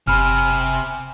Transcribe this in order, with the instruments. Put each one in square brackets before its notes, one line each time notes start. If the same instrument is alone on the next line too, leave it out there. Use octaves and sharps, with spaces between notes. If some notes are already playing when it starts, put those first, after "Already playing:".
[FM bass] F#1 [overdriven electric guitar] C3 [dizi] G#5 [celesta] B5 F6